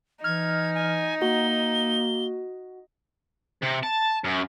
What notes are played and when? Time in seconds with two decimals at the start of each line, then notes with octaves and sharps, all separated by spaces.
0.24 E3 D#4 F6 G#6
0.75 G#5
1.22 A#3 F#4 G7
3.62 C3
3.83 A5
4.24 F#2